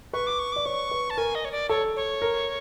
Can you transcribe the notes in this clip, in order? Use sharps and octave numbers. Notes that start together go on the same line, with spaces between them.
B4 C#6
D6
C#6
D5 D6
C#5 C#6
B4
A5
A#4 G#5
D#5
C#5
D5
A4 C#5
C#5
A#4